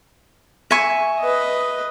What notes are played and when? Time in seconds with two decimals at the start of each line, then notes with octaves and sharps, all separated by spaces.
0.71 E5 G#5 C#6
1.20 B4 D#5